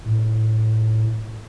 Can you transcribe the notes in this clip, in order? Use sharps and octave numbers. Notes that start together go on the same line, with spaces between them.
A2